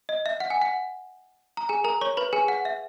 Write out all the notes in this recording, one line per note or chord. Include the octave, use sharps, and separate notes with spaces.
D#5
E5
F#5
G#5
F#5
A#5
G#4 G#5
A#4 A#5
C#5 C#6
B4 B5
G#4 G#5
F#5
E5